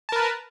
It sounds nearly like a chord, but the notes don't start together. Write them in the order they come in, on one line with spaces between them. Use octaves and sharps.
A5 A#4 B4